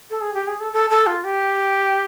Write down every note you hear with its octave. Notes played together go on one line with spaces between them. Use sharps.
A4
G#4
G4
G#4
A4
A4
A4
F4
G4